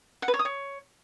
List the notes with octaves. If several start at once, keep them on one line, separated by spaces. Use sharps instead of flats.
F#5
B4
C#5
D#6
C#5